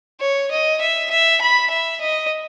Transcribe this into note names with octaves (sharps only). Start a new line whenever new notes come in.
C#5
D#5
E5
E5
B5
E5
D#5